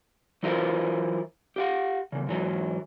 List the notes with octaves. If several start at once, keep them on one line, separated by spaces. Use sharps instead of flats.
E3 F#3 E4 F4 A#4 C5
G4 F5 F#5
E2 C#3
G#2 E3 F#3